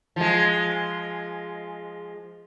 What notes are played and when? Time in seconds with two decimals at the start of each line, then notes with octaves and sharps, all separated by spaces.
0.16 F3 G#3